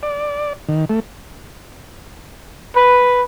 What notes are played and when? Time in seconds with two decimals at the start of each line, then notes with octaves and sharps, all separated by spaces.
0.03 D5
0.69 D#3
0.90 A3
2.77 B4